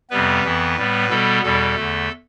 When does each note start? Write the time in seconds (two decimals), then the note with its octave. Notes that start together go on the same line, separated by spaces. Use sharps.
0.10 F2 C3 G3 B3 B4
0.43 F2 E3 B3
0.77 A2 G3 B3
1.09 B2 G3 B3 A4
1.43 E2 B2 G3 A4
1.76 E2 D3 A3